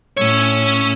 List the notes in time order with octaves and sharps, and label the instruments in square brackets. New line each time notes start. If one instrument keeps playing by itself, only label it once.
[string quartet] A2 E6 [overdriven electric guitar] C#4 C#5